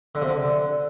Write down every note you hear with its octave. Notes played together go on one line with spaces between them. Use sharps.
D3
C3
D3